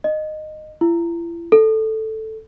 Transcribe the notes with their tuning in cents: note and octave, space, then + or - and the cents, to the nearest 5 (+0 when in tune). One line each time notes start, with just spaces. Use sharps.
D#5 -15
E4 +40
A4 +0